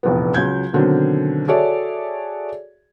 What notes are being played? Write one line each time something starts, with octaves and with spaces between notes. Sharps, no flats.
F1 A#1 E2 B3
C#2 F#3 G6 G#6
B2 D3 D#3 F#3 C4
F#4 G#4 A4 C#5 D5 E5